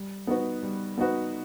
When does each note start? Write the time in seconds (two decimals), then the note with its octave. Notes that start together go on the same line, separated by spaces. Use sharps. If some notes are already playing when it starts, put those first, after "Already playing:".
Already playing: G3
0.27 B3 D#4 F#4 B4
0.63 G3
0.98 B3 D#4 F#4 B4